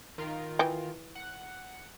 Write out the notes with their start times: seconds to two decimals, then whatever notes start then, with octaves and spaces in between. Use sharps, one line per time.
0.18 D#3 F4 A#4
0.59 E3 G5
1.15 F#5